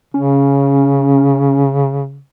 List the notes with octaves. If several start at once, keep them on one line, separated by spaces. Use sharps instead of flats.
C#3 C#4